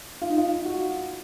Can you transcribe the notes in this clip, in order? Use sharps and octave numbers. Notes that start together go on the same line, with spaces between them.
F4
D#4
F4
F#4